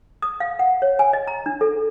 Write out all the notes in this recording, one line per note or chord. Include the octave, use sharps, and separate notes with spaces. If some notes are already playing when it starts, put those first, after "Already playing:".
D#6
F5
F#5
C#5
G#5
D#5
A#5
D4
A4